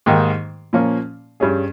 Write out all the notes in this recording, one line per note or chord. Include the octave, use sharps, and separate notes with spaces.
G#2 D#3 A#3 D#4 G4
A#2 F3 A#3 C#4
G2 G3 C#4 G#4